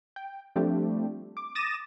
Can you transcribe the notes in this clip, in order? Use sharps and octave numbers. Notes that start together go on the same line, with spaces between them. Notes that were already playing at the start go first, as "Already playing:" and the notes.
G5
F3 G3 A3 C4 D4 G4
D6
D6 D#6 A6 A#6 D#7 E7